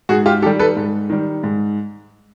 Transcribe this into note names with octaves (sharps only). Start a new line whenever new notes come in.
G#2 F#4 G#4
F4 G4
D#3 G3 G4 A4
A4 B4
G#2
D#3 G3
G#2